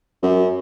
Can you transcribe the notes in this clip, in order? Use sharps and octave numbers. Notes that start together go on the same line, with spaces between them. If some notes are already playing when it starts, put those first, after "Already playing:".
F#2